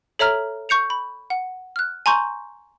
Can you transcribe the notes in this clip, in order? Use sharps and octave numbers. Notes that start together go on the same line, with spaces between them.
A4 C#5 E5 A#5 F6
C#6 G6 C#7 F7
B5
F#5
F6 F#6
G#5 A#5 C6 C#6 G6